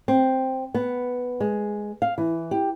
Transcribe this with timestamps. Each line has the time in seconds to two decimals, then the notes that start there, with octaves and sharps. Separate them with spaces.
0.08 C4
0.74 B3
1.40 G#3
2.02 F5
2.18 E3
2.51 G4